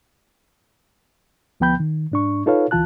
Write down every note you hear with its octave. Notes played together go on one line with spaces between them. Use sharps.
D2 F3 B3 G5 B5 G6
D#3
G#2 D4 C#6
D#4 F4 A4 B4 C#5 F5
D2 E3 F4 A5 F#6